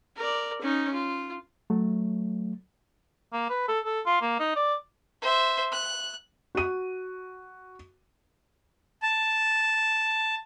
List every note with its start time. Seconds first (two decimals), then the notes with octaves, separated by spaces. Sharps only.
0.16 A#4 D5
0.61 C#4 D#4
0.94 F4
1.70 F#3 A3
3.33 A#3
3.50 B4
3.68 A4
3.85 A4
4.06 F4
4.22 A#3
4.39 D#4
4.56 D5
5.22 C5 E5
5.72 F#6
6.55 F#4 D#7
9.02 A5